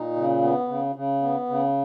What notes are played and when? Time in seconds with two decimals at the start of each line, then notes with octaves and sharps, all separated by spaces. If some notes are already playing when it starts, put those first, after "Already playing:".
Already playing: A#2 D#4
0.16 C#3
0.42 B3
0.69 C#3
0.96 C#3
1.22 B3
1.49 C#3